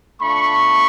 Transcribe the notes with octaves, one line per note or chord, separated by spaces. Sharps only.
A3 D4 F4 B5 C#6